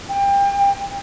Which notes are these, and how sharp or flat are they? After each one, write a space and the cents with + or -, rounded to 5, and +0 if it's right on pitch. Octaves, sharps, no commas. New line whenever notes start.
G5 +25